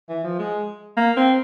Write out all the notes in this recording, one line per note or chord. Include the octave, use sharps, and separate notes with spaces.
E3
F3
G#3
A#3
C4